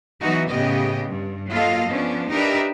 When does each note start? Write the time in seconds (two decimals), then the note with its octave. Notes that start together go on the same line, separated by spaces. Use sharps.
0.22 E3 F#3 B3 D#4 F#4
0.52 A2 C#3 B3 G4 D#5
1.07 G2
1.50 F#3 A#3 F4 A4 D#5 F5
1.89 F3 B3 C#4 D4
2.32 D4 D#4 G4 A#4 B4 E5